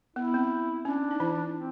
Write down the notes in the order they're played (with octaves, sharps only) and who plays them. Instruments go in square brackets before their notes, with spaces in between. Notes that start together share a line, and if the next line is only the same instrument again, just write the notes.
[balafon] B3 [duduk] E4
[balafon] C4
[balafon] C#4 [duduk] D4
[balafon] D#4
E3 E4
[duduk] C4